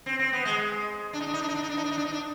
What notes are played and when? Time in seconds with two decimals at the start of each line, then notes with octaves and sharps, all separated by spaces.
0.06 C4
0.19 C4
0.33 B3
0.45 G#3
1.13 D4
1.21 D#4
1.26 D4
1.34 D#4
1.42 D4
1.49 D#4
1.55 D4
1.63 D#4
1.69 D4
1.77 D#4
1.84 D4
1.91 D#4
1.98 D4
2.05 D#4
2.13 D4